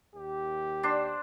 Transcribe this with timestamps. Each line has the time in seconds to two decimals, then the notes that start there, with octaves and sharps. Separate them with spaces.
0.15 D#2 G4
0.83 D4 C5